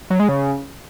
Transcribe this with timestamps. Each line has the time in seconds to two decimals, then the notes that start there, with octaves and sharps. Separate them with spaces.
0.10 F#3
0.20 G#3
0.29 C#3